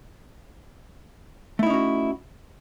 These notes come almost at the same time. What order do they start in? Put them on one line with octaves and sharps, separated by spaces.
A3 E4 D#4 C#4 F#4